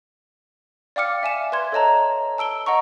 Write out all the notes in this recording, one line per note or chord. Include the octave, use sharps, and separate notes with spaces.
D5 F5 G5 D6 F6 C#7
E5 G#5 E7
B4 D5 C6 G#6
A4 C#5 D#5 A5 A#5
A5 E6 D7 G7
D#5 F#5 A#5 C#6